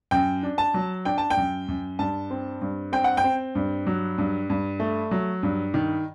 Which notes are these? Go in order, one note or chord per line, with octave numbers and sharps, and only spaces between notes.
F#2 G5
D4
A5
F#3
D4 G5
A5
G5
F#2
F#2
G2 A5
C4
G2
C4 G5
F#5
G5
C4
G2
F#3
G2
G2
A3
F#3
G2
D#3